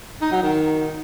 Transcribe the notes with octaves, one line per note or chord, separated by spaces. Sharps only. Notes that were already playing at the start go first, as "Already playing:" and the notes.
D#4
F#3
D#3